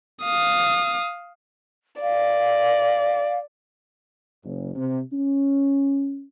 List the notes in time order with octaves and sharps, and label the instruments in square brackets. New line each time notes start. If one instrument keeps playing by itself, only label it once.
[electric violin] F5 D#6
[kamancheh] D5 [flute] F5
[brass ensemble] F#1
C3
C#4